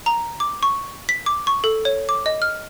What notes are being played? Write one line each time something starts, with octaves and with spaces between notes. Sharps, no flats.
A#5
D6
C#6
B6
D6
C#6
A4
C#5
D6
D#5
F6